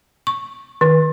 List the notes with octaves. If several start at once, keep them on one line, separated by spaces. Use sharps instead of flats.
C#6
D#3